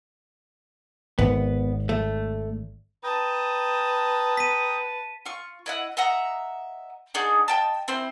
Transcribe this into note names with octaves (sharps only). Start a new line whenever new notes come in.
G#1 B3
A3
B4 G5 A5 A#5 D#6
B6 D#7
F4 C#6
E4 D#5 F#5
D#5 E5 F#5 A#5
D4 D#4 F#4 G#4
D#5 G5 A5
C4 E4 C5